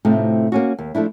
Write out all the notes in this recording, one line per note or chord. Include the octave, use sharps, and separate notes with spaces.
A2 C3 A3 C4 D#4 F4
A#3 C#4 F#4
D#2
F3 A3 D4 E4